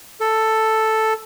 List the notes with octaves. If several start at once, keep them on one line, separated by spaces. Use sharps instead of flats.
A4